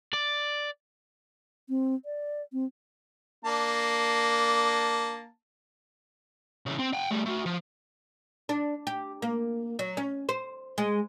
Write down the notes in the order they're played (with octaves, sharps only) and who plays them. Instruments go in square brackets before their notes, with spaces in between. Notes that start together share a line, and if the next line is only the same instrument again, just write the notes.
[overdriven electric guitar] D5
[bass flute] C4
D5
C4
[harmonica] A#3 D4 A5
[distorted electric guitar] C#3 E3
C4
G5 G#5
G3 A3
A3 F#4
F3
[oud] D4
G4
A#3
F#3
C#4
C5
G#3